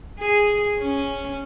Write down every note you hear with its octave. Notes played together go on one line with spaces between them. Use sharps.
G#4
C#4